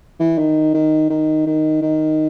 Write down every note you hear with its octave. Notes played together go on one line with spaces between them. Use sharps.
E3
D#3
D#3
D#3
D#3
D#3